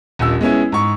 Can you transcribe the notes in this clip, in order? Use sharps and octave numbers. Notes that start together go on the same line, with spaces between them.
D#1 A#1 E6
G#3 B3 C#4 E4
G#2 C#6